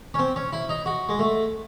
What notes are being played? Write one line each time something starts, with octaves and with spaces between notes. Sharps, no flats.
C#4
C4
C#4
E4
D#4
F#4
G#3
A3